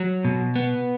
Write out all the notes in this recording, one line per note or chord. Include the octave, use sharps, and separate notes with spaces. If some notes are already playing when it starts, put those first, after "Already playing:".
Already playing: F#3
B2
B3